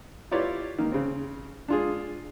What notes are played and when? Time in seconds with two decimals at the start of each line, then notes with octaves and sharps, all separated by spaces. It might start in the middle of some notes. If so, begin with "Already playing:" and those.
0.31 E4 F4 G4 B4 C#5 D5
0.79 D#3 A#3
0.92 C#3 C4
1.68 D4 F4 G#4